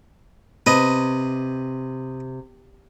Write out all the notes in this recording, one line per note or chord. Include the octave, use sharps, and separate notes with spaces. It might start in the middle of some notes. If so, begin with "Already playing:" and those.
C3 B4 D#5